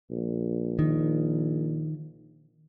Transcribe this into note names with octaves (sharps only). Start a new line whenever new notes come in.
A#1
D#3